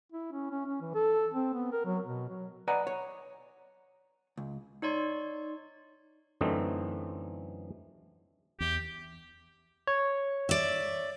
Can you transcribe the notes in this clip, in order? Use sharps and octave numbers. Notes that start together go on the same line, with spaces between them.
E4
C#4
C#4
C#4
E3
A4
C4
B3
A#4
F#3
B2
F#3
B4 D5 D#5 F#5 G#5 A#5
C#5
C#2
D#4 C#5 D5 C6
F#2 D3 E3 A3 C4 D#4
E2 G4
C#5
D5 E5